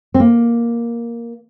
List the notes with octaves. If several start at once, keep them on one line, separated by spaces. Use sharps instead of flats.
C4
A#3